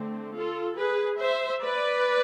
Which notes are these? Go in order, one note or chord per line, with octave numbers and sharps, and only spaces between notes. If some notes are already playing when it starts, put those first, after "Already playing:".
Already playing: D3 A3 C4
F4 A4
G#4 B4
C5 E5
B4 D5